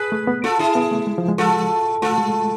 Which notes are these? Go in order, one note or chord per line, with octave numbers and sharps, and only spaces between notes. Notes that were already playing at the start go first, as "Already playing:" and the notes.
Already playing: G#4 B4
A3
B3
F4 A4
E4 G#4
B3
A3
G#3
F3
G#3
F4 A4
A3 F4 A4
G#3